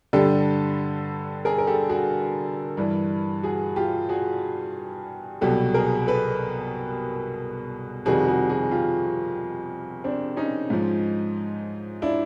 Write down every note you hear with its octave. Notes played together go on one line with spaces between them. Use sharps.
G2 D3 G3 G4 A4
G#4 A#4
A#4
G4 A4
F#4 G#4
G2 E3 G3
F#4 G#4
F4 G4
F#4 G#4
C2 B2 F#3 G4 A4
G#4 A#4
A4 B4
F2 C3 D#3 G3 F#4 G#4
F#4 G#4
F#4 G#4
F4 G4
C4 D4
C#4 D#4
G#2 F3
D4 E4